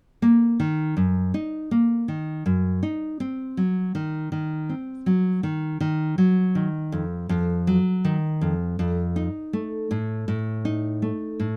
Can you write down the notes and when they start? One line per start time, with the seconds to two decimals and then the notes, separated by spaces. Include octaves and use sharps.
0.22 A#3
0.60 D#3
0.97 F#2
1.34 D#4
1.71 A#3
2.08 D#3
2.46 F#2
2.83 D#4
3.20 C4
3.57 F#3
3.95 D#3
4.32 D#3
4.69 C4
5.06 F#3
5.43 D#3
5.81 D#3
6.18 F#3
6.55 D#3
6.92 F2
7.29 F2
7.67 F#3
8.05 D#3
8.41 F2
8.79 F2
9.16 D#4
9.53 A3
9.91 A2
10.28 A2
10.65 D#4
11.02 A3
11.40 A2